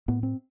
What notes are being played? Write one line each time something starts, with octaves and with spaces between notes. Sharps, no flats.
A2 B3
C4